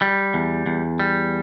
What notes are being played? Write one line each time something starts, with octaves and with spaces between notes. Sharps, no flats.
G3
E2
E2
G3